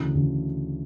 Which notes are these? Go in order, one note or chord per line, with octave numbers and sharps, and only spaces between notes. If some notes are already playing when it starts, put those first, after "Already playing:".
Already playing: D2 C#3 E3
D2 C#3 E3